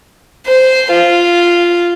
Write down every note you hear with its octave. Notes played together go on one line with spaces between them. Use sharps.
C5
F4